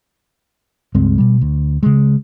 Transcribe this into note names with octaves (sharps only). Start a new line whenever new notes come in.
C#2 G2 G#3 C4
B2 G3
D2
C#3 G#3